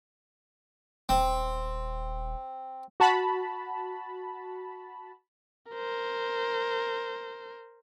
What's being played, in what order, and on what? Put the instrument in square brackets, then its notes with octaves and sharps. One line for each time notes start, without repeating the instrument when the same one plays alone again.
[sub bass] D#1 [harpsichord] C4
[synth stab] F#4 A5 B5
[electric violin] A#4 C5